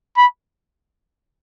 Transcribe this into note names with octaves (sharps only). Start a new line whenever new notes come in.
B5